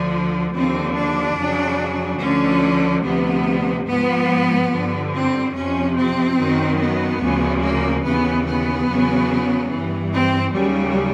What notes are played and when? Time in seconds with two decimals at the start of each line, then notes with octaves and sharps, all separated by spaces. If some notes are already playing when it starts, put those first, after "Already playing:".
Already playing: D2 D3 F3
0.54 D#2 D3 F3 C4
0.96 D4
1.37 F2 C#3 F#3
2.20 D2 D3 F3 C#4
3.03 D2 C3 F3 B3
3.87 G#2 F3 B3
4.70 G2 D3 F3
5.12 C4
5.53 F2 C3 F3 C#4
5.95 C4
6.37 F#2 D#3 F#3
6.78 B3
7.20 D2 C#3 F3
7.61 A#3
8.02 D#2 C#3 E3 B3
8.45 B3
8.87 E2 C#3 F#3
9.69 E3
9.74 G2
10.10 C4
10.52 D#2 C#3 F#3 G3